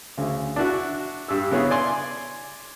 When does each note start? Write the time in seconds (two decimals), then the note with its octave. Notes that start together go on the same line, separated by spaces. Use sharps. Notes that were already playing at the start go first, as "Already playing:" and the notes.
0.17 D2 C#3
0.56 D4 E4 F#4
1.28 G2 E6
1.51 C#3 B3 C#4 E4 G#4
1.70 D5 G#5 C6